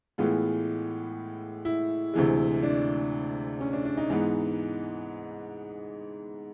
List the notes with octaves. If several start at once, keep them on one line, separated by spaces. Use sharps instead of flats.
A2 E3 G#3 B3 F4
E4
D2 C3 E3 G#3
D4
C#4
D4
D4
D#4
G#2 E3 G#3 B3 D#4